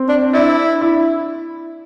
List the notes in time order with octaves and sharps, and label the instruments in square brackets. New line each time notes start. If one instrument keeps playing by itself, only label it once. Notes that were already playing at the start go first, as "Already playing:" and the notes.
Already playing: [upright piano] C4
[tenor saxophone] D4
[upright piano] D4 [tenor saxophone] E4
[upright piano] E4